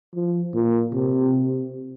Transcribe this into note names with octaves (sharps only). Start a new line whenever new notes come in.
F3
A#2
C3